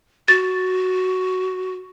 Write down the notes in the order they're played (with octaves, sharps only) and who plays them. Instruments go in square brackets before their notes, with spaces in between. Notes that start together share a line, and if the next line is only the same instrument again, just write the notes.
[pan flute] F#4 [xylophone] A6